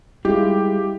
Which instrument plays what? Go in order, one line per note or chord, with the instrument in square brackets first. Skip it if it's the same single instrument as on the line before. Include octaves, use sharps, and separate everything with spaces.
[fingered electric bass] G3 G#3 [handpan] E4 F4 [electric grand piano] G4